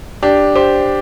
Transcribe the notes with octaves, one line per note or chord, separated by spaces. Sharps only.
D4 G4
G4 C5